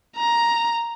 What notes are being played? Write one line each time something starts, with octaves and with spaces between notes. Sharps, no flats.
A#5